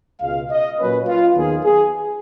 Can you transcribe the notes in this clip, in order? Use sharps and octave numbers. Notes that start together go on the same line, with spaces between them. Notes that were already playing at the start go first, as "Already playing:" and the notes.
C#2 B2 G#3 F5
D#5
A#2 F#3 A#3 C#4 B4
F4
D#2 D#3 F#3 B3 D#4 G#4
G#4